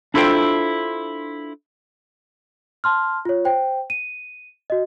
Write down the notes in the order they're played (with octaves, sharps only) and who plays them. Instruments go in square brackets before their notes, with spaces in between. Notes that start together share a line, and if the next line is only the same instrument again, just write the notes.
[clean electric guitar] D4 E4 F4 A4 C5 G5
[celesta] A5 C6 F6
F4 C#5
C5 G5
D#7
F#4 D#5